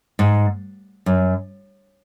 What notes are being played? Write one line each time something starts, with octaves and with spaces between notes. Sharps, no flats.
G#2
F#2